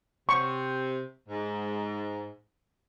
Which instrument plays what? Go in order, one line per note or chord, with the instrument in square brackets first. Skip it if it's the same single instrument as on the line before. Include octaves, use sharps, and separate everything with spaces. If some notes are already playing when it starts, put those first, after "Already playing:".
[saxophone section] C3 [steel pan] C#6
[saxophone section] G#2